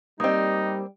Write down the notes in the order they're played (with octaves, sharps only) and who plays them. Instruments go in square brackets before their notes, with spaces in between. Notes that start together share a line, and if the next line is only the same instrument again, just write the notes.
[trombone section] G3 [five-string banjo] A#3 C4 [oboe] D#4 [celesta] D#5 D#6